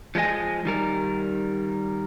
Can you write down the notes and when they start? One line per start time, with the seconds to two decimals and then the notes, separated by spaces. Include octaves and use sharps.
0.15 F3 G#3 C4 D#5 G#5
0.65 D#3 G3 A#4